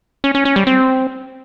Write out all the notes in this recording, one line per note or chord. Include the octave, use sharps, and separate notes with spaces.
C#4
C#4
C#4
G3
C4